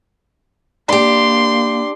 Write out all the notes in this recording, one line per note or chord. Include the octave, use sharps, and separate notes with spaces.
A#3 D4 G4 C6